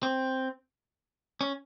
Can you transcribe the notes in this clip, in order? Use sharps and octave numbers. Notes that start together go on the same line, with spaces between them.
C4
C#4